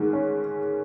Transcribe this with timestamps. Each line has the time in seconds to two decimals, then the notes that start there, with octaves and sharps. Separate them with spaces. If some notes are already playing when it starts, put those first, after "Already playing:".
Already playing: G#2 D#3 G#3
0.13 C#4